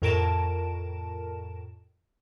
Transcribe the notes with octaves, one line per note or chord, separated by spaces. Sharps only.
F2 A2 A#4 A5 D7 E7